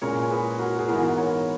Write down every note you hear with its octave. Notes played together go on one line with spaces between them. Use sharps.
A#2 G#3 C#4 A#4 C#5
G#4 B4
F#4 A#4
G#4
G#2 E3 B3 F#4 A#4
A#4 C#5